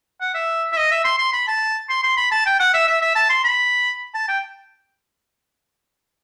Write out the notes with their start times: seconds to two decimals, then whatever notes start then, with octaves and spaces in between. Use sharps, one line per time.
0.21 F#5
0.34 E5
0.72 E5
0.77 D#5
0.91 E5
1.04 C6
1.18 C6
1.33 B5
1.47 A5
1.89 C6
2.03 C6
2.17 B5
2.31 A5
2.46 G5
2.59 F#5
2.74 E5
2.87 E5
3.02 E5
3.15 A5
3.29 C6
3.44 B5
4.14 A5
4.28 G5